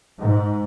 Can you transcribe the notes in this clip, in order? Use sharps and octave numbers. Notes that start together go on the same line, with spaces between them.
G#2